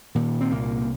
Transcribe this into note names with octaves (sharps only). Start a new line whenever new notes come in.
A#2 D#3
C4
C2 A#3